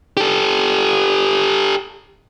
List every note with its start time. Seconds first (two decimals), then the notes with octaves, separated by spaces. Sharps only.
0.17 G4 A4